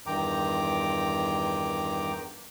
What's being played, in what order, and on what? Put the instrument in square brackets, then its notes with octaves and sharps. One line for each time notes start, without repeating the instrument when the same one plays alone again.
[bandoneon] E2 G2 D#3 G5 A#5 D6